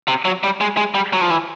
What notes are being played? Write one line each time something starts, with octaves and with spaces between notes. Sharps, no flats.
C3
F#3
G3
G#3
G#3
G3
F#3
F3
E3